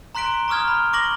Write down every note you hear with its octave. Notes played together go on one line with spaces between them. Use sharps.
A#5 C6 F#6 B6 D7 G7
A#5 C#6 D#6 F6 G#6
B5
C#6 D6 A#6 F#7 G7